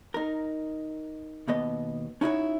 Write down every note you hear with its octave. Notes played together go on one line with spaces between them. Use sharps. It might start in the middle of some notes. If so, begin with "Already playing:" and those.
D#4 A#4
D#2 B2 B3 D#5
C#4 D#4 E4 F#4 A#4 C#5